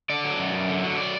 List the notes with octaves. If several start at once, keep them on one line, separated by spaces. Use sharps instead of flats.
D3 D5
F#3
F#2
F#2
D3
F#3
D5